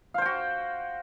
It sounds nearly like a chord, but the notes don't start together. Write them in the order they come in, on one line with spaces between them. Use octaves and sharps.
F5 C5 G5 F#4